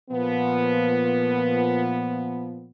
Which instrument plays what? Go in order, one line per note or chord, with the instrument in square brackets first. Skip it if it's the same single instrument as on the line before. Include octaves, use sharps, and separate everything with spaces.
[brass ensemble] A#2 F3 B3